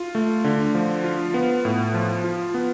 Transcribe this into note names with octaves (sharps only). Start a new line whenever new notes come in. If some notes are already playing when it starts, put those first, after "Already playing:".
Already playing: F4
A3
D3
F3
F4
B3
A2
F3
F4
B3